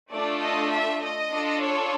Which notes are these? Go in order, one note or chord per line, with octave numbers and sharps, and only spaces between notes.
A3 D4 F4 A4 D5
D#5
E5
D#5
D4 F4 A4
C#5